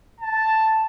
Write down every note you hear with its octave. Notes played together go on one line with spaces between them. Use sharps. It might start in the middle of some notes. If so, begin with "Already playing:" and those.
A5